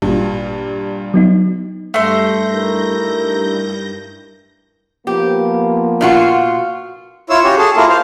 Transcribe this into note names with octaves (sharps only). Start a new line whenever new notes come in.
G#1 G2 A#2
F#3 B3 D#4
G2 A3 C6 G6 A#6
D#4 E4 A#4
F3 A#3 B3 G4
A#2 F4 F#4
E4 F4 C#5 E6
C#4 F#4 G4 C#5
G#4 A4
A#3 E4 F4 A4 A#4
C5 F5